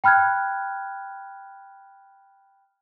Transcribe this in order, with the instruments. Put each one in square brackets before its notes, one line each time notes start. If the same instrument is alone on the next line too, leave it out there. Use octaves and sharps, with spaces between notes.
[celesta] G5 B5 F6 F#6 G#6